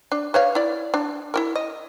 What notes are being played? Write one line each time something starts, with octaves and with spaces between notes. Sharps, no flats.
D4
B4 C#5 F5
E4 D5
D4
E4 F#4 A#4
D#5